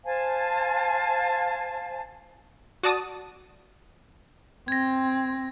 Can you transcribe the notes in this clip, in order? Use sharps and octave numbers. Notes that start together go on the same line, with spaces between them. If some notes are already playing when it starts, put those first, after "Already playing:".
C5 F5 G#5 A5
F#4 D5 A5 D#6
C4 G#6 A#6